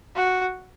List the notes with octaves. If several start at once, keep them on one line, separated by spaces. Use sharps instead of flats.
F#4